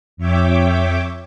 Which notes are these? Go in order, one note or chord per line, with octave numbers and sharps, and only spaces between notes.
F2 C#5 E5 G5 D6